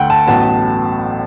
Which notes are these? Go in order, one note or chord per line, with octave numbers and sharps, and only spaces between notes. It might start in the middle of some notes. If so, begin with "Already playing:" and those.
Already playing: D2 D3 A3 F#5 G5
A5
A1 A2 F#3 B3 A5